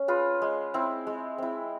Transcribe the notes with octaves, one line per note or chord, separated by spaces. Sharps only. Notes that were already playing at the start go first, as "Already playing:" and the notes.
Already playing: C#4
F4 G#4 B4
G#3
C4 E4
G#3
C4 E4